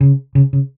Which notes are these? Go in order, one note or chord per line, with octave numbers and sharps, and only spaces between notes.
C#3
C#3
C#3